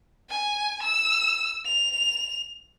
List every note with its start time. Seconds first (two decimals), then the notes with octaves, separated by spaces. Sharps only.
0.29 G#5
0.83 E6
1.66 F7